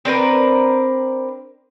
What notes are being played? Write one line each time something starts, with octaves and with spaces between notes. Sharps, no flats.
C4 D4 A#4 B4